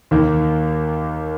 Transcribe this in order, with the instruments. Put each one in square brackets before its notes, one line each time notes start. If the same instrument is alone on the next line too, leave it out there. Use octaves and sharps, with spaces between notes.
[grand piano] D#2 D#3 A#3